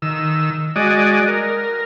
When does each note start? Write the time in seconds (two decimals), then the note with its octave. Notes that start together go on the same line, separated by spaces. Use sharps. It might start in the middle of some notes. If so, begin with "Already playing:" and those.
0.02 D#3 E6
0.76 G#3 F#4 D5 D#5
1.28 A#4